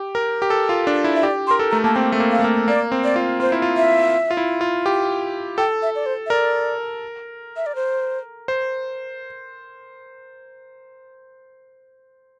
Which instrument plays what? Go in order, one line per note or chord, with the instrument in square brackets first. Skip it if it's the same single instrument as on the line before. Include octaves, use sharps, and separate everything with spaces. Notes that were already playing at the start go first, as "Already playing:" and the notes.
Already playing: [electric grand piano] G4
A#4
G4
A4
F4
D4
E4
[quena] E5
[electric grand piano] G4 [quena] D5
[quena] C6
[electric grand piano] A#4
A4
[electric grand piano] A3 [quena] A#5
[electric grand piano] A#3 [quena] A5
[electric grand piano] C4 [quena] G5
[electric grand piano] A3
A#3
[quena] F5
[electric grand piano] A3
A#3
[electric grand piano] A#3 [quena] D5
[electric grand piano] C4
[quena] D5
[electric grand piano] F4
[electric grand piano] F4 [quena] C5
[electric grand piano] E4
F4
[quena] E5
[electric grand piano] F4
E4
F4
G4
[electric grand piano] A4 [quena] G5
[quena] E5
D5
C5
E5
[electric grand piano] A#4 [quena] D5
[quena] E5
D5
C5
[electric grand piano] C5